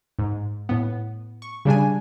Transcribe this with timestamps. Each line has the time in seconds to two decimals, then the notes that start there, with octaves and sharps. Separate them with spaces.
0.19 G#2
0.69 A2 B3
1.42 C#6
1.65 C#3 G3 D4 G#5